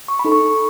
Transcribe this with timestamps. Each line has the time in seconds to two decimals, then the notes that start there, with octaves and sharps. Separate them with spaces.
0.08 C#6
0.19 B5
0.25 D#4 A4
0.32 C#6